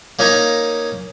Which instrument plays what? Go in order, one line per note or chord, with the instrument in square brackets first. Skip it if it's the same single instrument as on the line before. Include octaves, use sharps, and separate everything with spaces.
[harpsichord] A#3 C#4 D#4 G#5 A#5